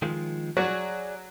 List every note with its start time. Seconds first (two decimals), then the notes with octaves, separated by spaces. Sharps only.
0.02 D#3 F3 G#3
0.57 F#3 F#4 G#4 D5